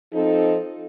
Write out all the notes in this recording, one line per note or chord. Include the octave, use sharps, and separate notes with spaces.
F3 C4 D#4 A4